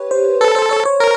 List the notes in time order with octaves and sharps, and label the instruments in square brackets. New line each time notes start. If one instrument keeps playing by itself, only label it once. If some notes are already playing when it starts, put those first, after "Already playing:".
Already playing: [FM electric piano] G4 B4 C#5
C5
[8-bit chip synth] A4 [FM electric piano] B4
[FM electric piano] C5
C#5
C#5
[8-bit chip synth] A#4